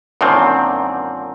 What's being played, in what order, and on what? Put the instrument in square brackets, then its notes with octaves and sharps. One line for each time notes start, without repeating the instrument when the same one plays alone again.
[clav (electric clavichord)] F#2 A#2 D3 D#3 C4